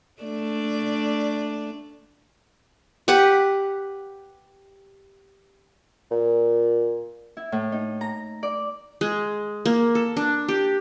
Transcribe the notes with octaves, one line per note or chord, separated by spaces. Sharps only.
A3 D4 D5
G4 B4 F#5
A#2
E4
A2
D#4
A#5
D5
G#3
A#3
A4
D4
G4